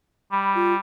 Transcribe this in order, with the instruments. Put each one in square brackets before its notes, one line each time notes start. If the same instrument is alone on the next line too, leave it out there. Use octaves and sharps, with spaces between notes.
[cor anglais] G3 [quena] B5
[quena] F4